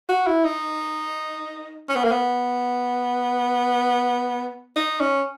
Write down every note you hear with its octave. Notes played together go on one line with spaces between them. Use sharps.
F#4
E4
D#4
C#4
B3
A#3
B3
D#4
C#4